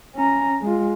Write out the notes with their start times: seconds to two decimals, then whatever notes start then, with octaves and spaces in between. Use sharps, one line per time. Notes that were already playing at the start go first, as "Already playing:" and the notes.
0.15 C#4 A#5
0.62 G#3 F4